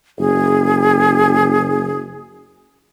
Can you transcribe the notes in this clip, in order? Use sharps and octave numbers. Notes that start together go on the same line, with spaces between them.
F#1 G#4